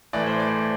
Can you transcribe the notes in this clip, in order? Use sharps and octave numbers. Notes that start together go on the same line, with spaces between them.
A2 E3 D5
C5
D5